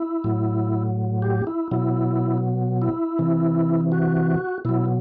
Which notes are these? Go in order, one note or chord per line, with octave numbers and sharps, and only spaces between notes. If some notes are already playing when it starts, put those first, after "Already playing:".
Already playing: E4
A2 F#3
G4
E4
B2 F#3 E4
E4
C3 E3
F#4
B2 F#3 E4